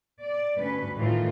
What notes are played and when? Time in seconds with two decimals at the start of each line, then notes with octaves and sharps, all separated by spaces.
0.21 D5
0.59 D2 G2 C#4 B4
0.98 A2 D#3 E3 A3 F4